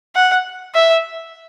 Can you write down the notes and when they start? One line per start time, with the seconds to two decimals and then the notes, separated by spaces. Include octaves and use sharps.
0.15 F#5
0.75 E5